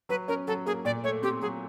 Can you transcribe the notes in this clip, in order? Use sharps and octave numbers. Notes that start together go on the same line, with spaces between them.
F#3 B4
C#4 A#4
F#3 A4
A#3 G#4
A#2 D5
A3 C#5
C4 G4
F#3 G#4